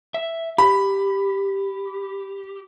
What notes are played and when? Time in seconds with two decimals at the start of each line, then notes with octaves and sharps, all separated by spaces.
0.14 E5
0.58 G4 B5